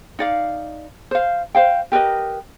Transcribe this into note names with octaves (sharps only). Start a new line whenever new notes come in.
D#4 D5 F5
C5 F5
C5 F5 G5
G4 A#4 B4 D#5